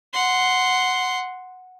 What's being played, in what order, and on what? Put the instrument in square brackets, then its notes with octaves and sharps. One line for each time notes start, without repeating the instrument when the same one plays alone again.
[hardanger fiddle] F#5 C6